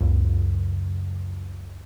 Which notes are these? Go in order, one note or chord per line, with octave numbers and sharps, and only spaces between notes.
C#2 F#2